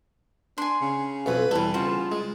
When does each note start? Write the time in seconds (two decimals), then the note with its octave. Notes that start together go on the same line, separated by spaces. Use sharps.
0.58 D4 G#5 C6
0.81 C#3
1.26 B1 F2 B4
1.51 E2 G3 E4 A4
1.74 C#3 F4 F#4 C5 A5
2.12 G#3